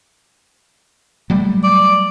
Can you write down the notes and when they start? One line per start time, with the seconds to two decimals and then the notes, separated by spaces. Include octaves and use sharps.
1.30 F#3 G3 A3
1.64 D5